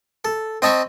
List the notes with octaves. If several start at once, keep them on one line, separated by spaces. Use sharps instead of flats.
A4
C4 D#5 A5 B5 C#6